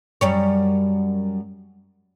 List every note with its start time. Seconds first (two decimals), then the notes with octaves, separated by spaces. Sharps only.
0.21 F#2 G3 C#5